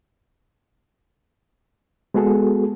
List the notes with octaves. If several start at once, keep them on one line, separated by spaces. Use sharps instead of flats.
G#3 B3 F#4 G#4 A4